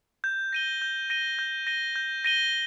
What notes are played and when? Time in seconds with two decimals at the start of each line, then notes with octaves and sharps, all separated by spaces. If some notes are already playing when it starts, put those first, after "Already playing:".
0.24 G6
0.53 A#6 D#7 G7
0.82 G6
1.10 A#6 D#7 G7
1.39 G6
1.67 A#6 D#7 G7
1.96 G6
2.24 A#6 D#7 G7